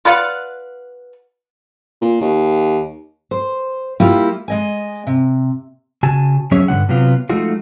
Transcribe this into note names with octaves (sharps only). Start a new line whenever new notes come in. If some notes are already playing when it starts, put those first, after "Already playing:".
F4 B4 D5 F5 F#5
A#2
D#2
C5
G3 A#3 E4 F4 G4
G#3 D#5 G#5
C3
C#3 F#4 G#5 A5
F2 F#3 C#4 G#4 C#5 E5
G2 D3 F3 F#5
C3 F#3 B3 F4
F3 G#3 A3 D#4 F4 F#4